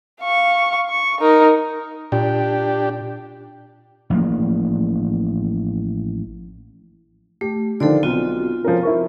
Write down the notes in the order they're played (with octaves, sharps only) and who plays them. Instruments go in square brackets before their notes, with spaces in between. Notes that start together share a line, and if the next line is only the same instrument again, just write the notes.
[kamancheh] F5 C#6
C#6
D#4 A#4
[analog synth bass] A#2 [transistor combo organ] D4 G4
[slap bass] A1 F3 A#3
[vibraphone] A3 [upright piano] G4
[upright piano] D3 D#3 F3 [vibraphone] A4 C5 D5
[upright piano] B1 [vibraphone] C4 F4 F#4
[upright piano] F3 C#4 A#4
E4 A#4 C#6